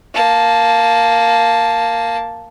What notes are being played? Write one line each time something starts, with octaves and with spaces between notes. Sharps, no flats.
A#3 A5